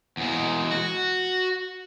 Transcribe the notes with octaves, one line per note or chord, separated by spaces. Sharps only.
E2 G#3
F#4